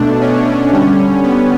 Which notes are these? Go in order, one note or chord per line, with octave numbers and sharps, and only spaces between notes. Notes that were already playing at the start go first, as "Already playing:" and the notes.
Already playing: B2 A3 D4
C#4
D3 G3 C#4
B3